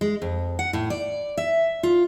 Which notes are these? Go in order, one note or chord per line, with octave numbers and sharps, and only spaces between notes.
G#3
F2
F#5
A2
D5
E5
F4